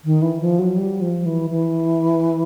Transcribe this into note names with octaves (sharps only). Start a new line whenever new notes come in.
D#3
E3
F3
F#3
G3
F3
E3
E3